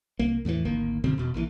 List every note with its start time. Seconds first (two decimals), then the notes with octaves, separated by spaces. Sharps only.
0.19 C2 A#3
0.45 E2 A2 D3 E3
0.65 G#1 D2 D#3 A#3
1.04 F#1 B2 D3 C4
1.18 E1 B2
1.34 A#1 A#2 D#3 E3